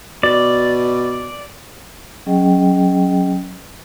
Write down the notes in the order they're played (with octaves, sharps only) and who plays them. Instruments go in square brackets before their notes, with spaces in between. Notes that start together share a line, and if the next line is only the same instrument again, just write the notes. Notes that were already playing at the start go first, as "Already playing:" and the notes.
[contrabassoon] B2 [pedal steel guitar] D5
[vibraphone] F#3 C#4 G#4 D#5 G5